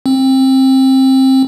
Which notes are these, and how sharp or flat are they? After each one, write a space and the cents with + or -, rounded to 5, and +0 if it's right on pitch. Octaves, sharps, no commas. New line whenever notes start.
C4 +20